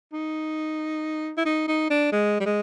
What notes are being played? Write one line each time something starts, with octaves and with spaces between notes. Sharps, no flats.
D#4
E4
D#4
D#4
D4
G#3
G3
G#3